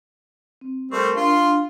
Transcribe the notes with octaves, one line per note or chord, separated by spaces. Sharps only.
C4
G3 A3 C4 G4 A#4 C#6
D4 F4 C6